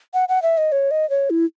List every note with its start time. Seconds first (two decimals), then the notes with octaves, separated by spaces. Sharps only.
0.14 F#5
0.29 F#5
0.42 E5
0.58 D#5
0.72 C#5
0.91 D#5
1.10 C#5
1.30 E4